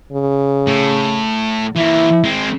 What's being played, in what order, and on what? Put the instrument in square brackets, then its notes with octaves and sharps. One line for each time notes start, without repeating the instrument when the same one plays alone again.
[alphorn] C#3
[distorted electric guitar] A2
[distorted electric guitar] E3 A#3 [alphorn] E4
[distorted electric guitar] G#3 C4